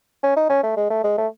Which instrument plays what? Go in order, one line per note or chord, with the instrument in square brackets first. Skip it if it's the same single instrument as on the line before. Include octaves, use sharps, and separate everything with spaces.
[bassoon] C#4
D#4
C#4
A3
G#3
A3
G#3
A3